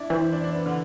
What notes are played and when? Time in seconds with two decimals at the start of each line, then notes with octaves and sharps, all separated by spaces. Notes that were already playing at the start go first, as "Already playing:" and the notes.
Already playing: D4 E4
0.10 E3 C4
0.21 C4
0.32 D4
0.44 D4
0.54 B3
0.66 D3